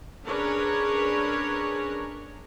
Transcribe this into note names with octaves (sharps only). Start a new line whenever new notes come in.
C#4 D4 G#4 A#4 B4 C#5